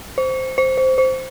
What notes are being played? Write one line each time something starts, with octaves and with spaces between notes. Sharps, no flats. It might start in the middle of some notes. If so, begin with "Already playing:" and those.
C5
C5
C5
C5